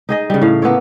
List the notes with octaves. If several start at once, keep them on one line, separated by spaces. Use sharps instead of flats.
D#4 G#4 D#5
C#3 G3
A2 F5
A#3 B3 A4 C#5